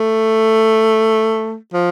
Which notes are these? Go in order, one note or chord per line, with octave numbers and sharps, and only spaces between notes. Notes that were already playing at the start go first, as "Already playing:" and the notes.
Already playing: A3
F3